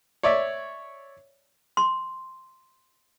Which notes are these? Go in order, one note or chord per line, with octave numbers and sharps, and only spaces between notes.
C#5 D5 E5
C6